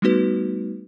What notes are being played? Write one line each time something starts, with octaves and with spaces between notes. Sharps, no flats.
G3 A3 B3 D#4 F#4 B4